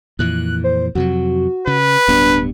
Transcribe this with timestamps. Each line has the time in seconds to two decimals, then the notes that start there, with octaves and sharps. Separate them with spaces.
0.19 F2 A#2 E3 F#6
0.64 C5
0.95 F2 C3 F#3 F#4
1.67 C#3 B4
2.08 D1 G2 B3 D4